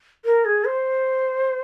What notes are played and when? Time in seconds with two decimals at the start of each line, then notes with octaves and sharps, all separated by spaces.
0.25 A#4
0.45 G#4
0.65 C5